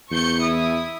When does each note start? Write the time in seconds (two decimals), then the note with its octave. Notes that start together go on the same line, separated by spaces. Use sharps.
0.11 E2 C#6 G6 C#7
0.41 E4 D#6